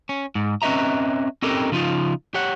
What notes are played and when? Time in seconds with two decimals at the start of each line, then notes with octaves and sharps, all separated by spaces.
0.09 C#4
0.35 G#2
0.62 C4 C#4 B4 D#5 E5 A#5
1.42 C4 C#4 D#4 G4 A4 A#4
1.72 C#3 F3 D#4 F4
2.34 G4 C#5 F#5